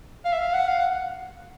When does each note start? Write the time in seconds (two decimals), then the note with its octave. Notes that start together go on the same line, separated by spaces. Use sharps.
0.25 F5
0.32 E5
0.39 F5
0.54 F#5
0.68 F5
0.78 F#5